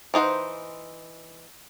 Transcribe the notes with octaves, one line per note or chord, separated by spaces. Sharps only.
E3 D#4 C5 F#5